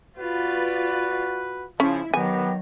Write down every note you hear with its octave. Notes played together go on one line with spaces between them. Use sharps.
F4 F#4 B4 D5
C#3 F3 C#4 E4
D#3 F#3 B3 G4 G#5